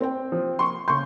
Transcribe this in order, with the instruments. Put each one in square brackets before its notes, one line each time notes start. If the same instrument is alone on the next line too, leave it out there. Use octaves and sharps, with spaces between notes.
[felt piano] C4 C5 G5
[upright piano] F3
C6 C#6
[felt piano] C#3 G6 [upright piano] C6 C#6